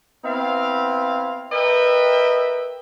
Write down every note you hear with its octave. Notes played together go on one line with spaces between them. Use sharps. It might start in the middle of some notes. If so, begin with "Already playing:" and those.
B3 C4 E4 F5
A#4 B4 D#5 E5 G5